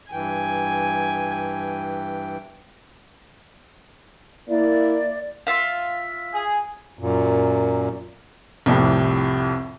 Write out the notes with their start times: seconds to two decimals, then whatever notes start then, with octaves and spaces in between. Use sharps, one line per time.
0.12 G2 E3 G5 G#5
4.48 A#3 E4 D5
5.47 F4 E5 F5
6.32 G#4
6.99 F#2 A#2
8.66 C2 F2 A2 C3